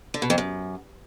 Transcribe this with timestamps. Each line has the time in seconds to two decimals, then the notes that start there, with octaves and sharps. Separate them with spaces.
0.14 D3
0.22 B2
0.30 F2
0.38 F#2